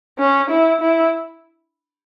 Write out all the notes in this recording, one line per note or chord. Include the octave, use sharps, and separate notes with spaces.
C#4
E4
E4